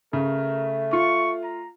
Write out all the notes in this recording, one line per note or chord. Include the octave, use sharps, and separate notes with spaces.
C#3 A3 A#4
F4 C#6
A#5